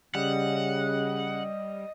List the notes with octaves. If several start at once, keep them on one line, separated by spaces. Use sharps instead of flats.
C#3 G3 D#5 F#5